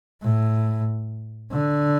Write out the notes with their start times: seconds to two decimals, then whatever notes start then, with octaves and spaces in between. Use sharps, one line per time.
0.22 A2
1.52 D3